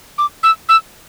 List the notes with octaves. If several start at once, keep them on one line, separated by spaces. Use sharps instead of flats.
D6
E6
E6